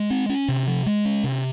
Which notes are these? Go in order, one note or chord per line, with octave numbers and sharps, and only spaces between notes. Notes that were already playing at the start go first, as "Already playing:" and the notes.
Already playing: G#3
C4
C#4
C3
F3
G#3
C#4
C3